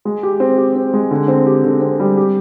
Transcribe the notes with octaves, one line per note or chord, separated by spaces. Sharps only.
G#3
G4
C4
G4
C4
G#3
D3
C4
G4
D3
C4
G3
G4